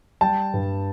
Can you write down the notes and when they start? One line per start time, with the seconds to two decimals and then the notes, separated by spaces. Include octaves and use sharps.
0.21 G3 G5 A5
0.54 G2